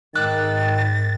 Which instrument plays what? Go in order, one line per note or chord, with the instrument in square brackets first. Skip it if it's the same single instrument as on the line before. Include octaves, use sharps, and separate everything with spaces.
[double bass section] G#2 [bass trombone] D#3 [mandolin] D6 E6 F#6 [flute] A6